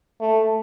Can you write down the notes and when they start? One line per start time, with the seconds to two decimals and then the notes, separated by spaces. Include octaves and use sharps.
0.20 A3